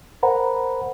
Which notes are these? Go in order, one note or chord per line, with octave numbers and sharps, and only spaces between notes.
A#4 C5 F#5 A#5 B5